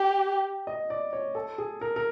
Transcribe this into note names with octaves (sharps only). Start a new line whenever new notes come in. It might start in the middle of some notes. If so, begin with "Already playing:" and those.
Already playing: G4
D#5
D5
C#5
A4
G#4
A#4
A#4